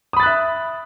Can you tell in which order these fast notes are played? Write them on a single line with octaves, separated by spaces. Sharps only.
D#6 B5 A6 F#6 E5